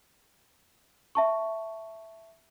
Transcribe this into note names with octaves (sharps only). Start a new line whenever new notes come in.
E5 A5 C#6